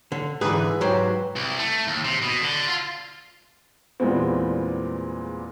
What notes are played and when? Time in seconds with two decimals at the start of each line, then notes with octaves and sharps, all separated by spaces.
0.12 D3
0.41 G#2 D3 E3 G#4 B4
0.81 G#2 F#3 G4 C5
1.36 C2
1.58 A3
1.87 D#2
2.05 C3
2.22 B2
2.42 D3
2.67 F4
4.00 E2 A#2 G3 G#3 B3 C4